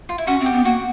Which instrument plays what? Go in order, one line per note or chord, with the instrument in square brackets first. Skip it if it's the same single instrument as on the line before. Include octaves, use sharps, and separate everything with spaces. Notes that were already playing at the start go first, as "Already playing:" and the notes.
[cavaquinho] F4
E4
[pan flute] C#4 [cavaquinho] F#4
[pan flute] C4
[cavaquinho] G4
[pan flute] B3
[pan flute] A#3 [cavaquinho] F#4